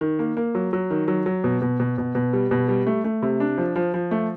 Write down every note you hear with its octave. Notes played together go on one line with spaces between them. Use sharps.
D#3
A#3
A#3
F#3
F#3
D#3
F#3
F#3
B2
B2
B2
B2
B2
G3
B2
G3
A3
A3
C3
D4
F3
F3
F3
A3